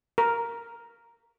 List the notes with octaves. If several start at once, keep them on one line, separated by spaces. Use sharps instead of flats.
A#4